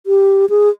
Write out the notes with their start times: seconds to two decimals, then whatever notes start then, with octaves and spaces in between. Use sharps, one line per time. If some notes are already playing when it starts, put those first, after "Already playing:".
0.07 G4
0.50 G#4